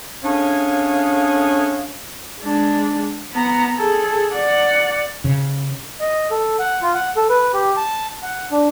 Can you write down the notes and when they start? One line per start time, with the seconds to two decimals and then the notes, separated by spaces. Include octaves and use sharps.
0.24 A3 C#4 D4 G#4 C#5 F5
2.41 G#3 D4
3.33 B3 A#5
3.78 G#4 A4
4.33 D5 F#5
5.24 C#3
6.00 D#5
6.31 A4
6.59 F#5
6.82 F4
6.94 F#5
7.16 A4
7.29 B4
7.53 G4
7.76 A5
8.23 F#5
8.51 D4